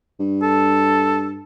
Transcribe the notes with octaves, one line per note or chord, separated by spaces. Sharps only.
G2
A4